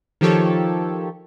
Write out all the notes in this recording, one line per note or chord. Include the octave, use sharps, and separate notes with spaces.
D#3 F3 G4 A4 C#5